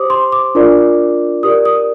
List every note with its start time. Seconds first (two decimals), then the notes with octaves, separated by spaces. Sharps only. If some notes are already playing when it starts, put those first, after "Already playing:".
Already playing: G4 C5 D6 D#6
0.10 C6
0.32 D6
0.55 D4 F4 A#4 D5
1.43 G4 A#4 D5 D#6
1.65 D#6